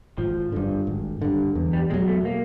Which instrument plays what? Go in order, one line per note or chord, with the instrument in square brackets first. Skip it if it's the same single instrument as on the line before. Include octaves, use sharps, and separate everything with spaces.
[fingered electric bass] G#1 [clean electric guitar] F3
[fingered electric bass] G2 D3
G#1
G2 D3
E2
[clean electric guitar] G3
[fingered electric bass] B2 F#3 [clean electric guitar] G#3
[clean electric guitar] A3
A#3